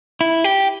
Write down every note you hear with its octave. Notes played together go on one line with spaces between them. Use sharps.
E4
G4